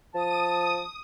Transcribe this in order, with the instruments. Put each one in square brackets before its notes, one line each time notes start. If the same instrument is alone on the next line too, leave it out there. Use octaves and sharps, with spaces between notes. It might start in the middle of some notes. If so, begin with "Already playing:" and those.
[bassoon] F3 [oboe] A5 [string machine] D#6